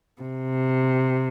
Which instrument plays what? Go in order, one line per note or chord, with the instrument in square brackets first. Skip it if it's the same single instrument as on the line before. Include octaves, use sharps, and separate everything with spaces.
[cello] C3